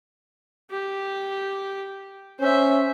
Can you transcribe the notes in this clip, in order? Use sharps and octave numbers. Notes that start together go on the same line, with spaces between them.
G4
C#4 C5 E5